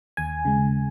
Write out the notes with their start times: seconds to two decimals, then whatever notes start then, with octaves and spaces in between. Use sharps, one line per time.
0.17 D#2 G#5
0.45 C#3 G#3